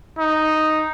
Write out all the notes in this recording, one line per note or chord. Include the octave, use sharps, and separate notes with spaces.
D#4